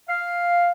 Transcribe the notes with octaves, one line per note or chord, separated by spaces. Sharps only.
F5